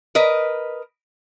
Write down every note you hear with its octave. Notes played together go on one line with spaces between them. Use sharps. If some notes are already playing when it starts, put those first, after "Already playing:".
A#4 B4 D#5